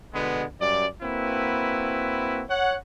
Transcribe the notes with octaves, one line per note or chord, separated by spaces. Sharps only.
B2 D3 G#3 B3
F#2 G3 D5
A#3 C4 E4 F#4 B4
C#5 F#5